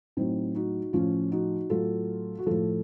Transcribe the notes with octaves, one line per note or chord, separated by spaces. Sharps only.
A2 F#3 C4 D#4
D#4 F#4
A2 F3 C#4 F4
D#4 F#4
A2 F#3 F4 A4
F#4
A2 F3 F4 A4